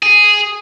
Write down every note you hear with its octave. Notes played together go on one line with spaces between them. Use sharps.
G#4